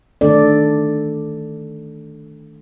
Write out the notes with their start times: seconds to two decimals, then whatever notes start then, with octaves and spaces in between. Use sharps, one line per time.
0.21 D3 D#3 A3 D4 A4 D5